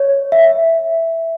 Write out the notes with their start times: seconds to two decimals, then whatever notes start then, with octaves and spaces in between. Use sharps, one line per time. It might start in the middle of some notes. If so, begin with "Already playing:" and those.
Already playing: C#5
0.32 E5